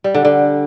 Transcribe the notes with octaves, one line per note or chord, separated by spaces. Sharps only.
G3
D3
D3